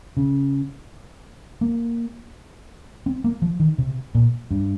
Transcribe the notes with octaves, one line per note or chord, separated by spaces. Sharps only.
C#3
A#3
C4
A#3
F3
D#3
C3
A#2
G2